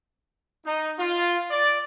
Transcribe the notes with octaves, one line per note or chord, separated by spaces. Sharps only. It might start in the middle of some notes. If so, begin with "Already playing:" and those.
D#4
F4
D5